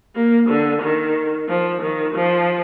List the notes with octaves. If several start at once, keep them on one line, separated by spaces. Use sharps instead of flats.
A#3
D3
D#3
F3
D#3
F3